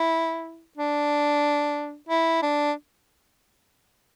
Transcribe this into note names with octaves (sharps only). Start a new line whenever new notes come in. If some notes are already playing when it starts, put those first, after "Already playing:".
Already playing: E4
D4
E4
D4